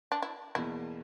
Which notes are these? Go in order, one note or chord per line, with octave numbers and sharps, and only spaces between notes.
D4
E4
E2 B2 A#3 E4